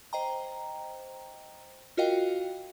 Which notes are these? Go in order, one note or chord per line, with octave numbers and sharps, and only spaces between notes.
C5 D#5 G5 A#5
F4 F#4 A#4 D#5 F5 G5